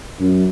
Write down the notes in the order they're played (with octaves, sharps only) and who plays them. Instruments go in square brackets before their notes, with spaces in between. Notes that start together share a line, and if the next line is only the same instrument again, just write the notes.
[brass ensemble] F#2